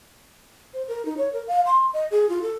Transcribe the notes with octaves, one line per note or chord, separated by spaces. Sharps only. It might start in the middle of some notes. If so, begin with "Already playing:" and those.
C5
A#4
D#4
C#5
A#4
F5
C6
D#5
G#4
F4
A4